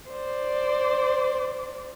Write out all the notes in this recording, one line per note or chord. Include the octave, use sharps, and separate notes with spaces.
C5 D5